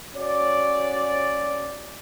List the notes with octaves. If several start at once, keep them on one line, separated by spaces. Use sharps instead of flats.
C#4 F#4 C#5 D5